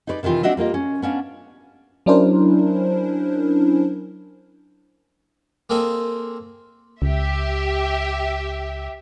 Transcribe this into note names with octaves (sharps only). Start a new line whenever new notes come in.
D#4 G#4 B4 C#5 D5
C3 D#3 E3 F4 G5
C4 D4 F#4 D#5 E5
G3 A#3 F4 D#5
C#4
B3 C#4 D4 F5
F#3 C#4 D4 E4 A#4 C5
A#3 C4 G#4 A4 D#5
C#2 G4 E5